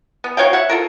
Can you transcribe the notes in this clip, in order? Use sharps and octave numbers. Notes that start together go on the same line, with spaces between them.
B3
F#4 C#5 F5 G5
C#5 E5 F#5
F4 A4 A#4